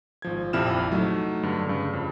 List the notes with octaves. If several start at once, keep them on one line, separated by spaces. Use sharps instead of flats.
G#1 F3 G#6
A#1 F2 C3 E4 F6 E7
F#3 A3 D#4
G2 D3
G2 C#3
F2